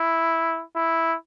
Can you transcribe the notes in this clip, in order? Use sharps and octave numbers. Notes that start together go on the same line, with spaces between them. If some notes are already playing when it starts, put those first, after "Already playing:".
Already playing: E4
E4